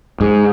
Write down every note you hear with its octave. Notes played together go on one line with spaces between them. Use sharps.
G#2